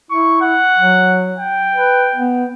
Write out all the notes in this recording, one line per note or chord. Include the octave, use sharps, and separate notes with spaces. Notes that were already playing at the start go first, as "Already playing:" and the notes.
E4 C#6
F#5
F#3
G5
B4
B3